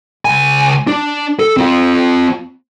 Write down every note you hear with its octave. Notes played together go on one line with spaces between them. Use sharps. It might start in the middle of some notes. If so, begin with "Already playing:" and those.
C#2 G#5
D4
A4
C4 F4